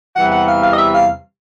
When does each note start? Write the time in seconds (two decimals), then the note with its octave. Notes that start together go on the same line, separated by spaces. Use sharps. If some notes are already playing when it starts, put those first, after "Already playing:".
0.16 E2 C3 E3 G3 F#5
0.32 F#5
0.48 F5
0.63 F5
0.74 D#5
0.79 E5
0.95 F5